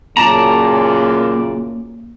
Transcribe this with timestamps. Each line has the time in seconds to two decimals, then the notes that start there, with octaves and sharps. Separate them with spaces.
0.17 F#2 A#2 C#3 A#3 D5 A5 A#5